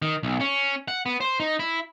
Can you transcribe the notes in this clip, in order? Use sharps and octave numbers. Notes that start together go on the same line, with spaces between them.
D#3
B1
C#4
F#5
B3
C5
D#4
E4